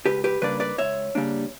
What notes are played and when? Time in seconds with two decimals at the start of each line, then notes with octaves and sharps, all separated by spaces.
0.06 C#2 G4 B4
0.24 G4 B4
0.42 C#3 G3 A#3 D4 B4 D5
0.60 B4 D5
0.78 C#2 C#5 E5
1.15 C#3 G3 A#3 D4